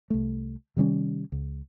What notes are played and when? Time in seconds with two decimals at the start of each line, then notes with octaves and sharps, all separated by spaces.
0.10 C2 A3
0.77 C3 D#3 G3 C#4
1.32 C#2